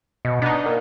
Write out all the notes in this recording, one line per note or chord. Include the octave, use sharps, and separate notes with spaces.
B2 D#5
B3 D4 D#4
A#2 A#4